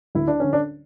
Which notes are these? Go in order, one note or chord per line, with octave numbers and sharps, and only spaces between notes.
D2 E4
D4
D3 C#4
D4